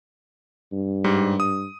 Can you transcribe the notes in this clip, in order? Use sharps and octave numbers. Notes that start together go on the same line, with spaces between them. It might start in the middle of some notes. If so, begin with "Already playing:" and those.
G2
G#2 G3
D#6